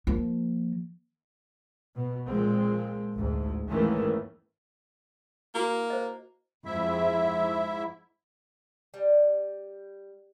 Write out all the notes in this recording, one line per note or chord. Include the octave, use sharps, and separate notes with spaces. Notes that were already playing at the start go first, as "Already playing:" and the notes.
F3 A#3
B2
A#2 F3 G#3 C4
A1 D2 G#2
G#2 D#3 E3 A3 A#3 C#4
A#3 E4 F#4
C5 D#5
F2 G#2 E4 E5
G3